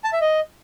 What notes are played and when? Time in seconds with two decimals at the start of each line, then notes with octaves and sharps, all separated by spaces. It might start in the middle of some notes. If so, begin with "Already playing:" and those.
0.04 A5
0.13 E5
0.21 D#5